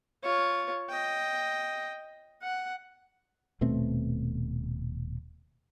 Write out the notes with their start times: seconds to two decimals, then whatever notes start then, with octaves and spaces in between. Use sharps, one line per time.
0.23 F4 C#5
0.89 D#5 G5
2.42 F#5
3.61 D#1 B2 A3 C4